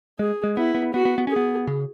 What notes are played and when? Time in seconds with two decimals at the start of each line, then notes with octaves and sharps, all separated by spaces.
0.19 G#3 G#4
0.44 G#3
0.57 B3 E4
0.75 B3
0.94 B3 F#4
1.05 B3
1.18 B3
1.27 C#4 G#4
1.36 B3
1.67 C#3